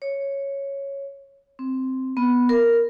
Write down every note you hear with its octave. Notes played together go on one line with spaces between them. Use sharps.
C#5
C4
B3
A#4